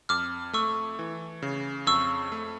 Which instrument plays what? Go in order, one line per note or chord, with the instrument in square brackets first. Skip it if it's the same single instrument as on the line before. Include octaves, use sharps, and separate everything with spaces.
[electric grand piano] F2 [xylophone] D6 F6
[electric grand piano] A3 [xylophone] C#6 E6
[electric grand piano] E3
C#3
[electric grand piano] F2 [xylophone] C#6 E6
[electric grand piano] A3